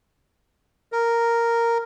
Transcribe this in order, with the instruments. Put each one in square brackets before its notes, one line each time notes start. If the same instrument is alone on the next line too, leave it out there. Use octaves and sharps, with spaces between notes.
[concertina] A#4